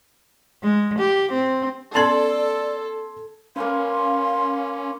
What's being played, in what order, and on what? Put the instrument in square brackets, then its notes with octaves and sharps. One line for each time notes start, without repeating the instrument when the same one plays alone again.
[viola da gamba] G#3
G4
C4
[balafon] B3 C#4 A#5 [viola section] A4 [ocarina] D5 [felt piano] C6 G#6 C7
[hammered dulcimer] A#3 B4 [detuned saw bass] C#4 [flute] F5 [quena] C6